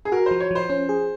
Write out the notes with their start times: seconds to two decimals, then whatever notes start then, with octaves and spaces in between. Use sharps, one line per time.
0.05 G#4
0.12 F#4 A#4
0.26 F3 C5
0.40 C#5
0.51 F3 C5
0.70 C#4
0.89 G#4